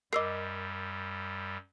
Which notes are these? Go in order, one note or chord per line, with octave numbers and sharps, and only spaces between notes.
F#2 G3 A#4 D#5 D6 E6 C7